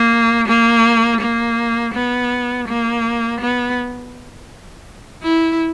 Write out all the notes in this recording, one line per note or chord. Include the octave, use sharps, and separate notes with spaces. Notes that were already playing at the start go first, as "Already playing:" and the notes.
Already playing: A#3
A#3
A#3
B3
A#3
B3
E4